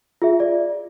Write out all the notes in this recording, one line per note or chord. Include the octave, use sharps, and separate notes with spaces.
F4 G#4 E5
D5